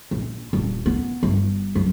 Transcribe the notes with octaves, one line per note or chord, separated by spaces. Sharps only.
A#1
D#1
B3
G1
F#2